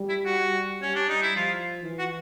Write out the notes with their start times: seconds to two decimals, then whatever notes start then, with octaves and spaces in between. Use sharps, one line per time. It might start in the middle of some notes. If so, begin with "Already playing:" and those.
Already playing: G3
0.09 E4
0.25 F#4
0.82 C#4
0.88 G3
0.95 D4
1.09 D#4
1.23 E4
1.36 F3 F4
1.83 E3
1.99 F#4